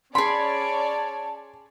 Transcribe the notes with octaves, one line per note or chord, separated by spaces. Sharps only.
C#4 G#4 C#5 D5 A5 B5 C6